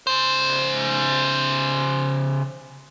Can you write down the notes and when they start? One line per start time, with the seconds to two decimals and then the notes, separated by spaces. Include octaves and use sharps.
0.07 C#3 C5